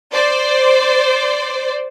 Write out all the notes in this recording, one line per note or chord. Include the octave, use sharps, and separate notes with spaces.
C5 D5